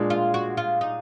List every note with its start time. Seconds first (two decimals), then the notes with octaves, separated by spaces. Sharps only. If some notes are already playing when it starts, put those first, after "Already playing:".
Already playing: A#2 G#3 D4
0.10 F4
0.34 F#4
0.57 F4
0.81 D#4